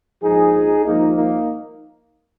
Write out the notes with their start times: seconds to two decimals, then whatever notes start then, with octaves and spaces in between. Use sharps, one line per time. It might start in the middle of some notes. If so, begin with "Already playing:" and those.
0.22 A#1 G#2 F3 D#4 G#4
0.85 G#1 G#2 F3 A#3 D#4
1.16 A#3 D#4